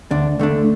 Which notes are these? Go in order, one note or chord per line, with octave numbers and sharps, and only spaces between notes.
D2 D4
D3 A3 D4